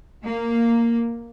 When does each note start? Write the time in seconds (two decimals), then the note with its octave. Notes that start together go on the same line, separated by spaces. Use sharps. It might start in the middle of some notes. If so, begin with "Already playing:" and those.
0.24 A#3